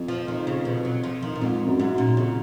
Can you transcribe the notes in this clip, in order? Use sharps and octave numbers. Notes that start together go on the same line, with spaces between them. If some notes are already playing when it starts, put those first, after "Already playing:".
Already playing: F2
F3
D#3
C#3
B2
F#3
F3
D#3
A#2
F2 G#2
F#2
G#2
F#2
A#2
F2 C#3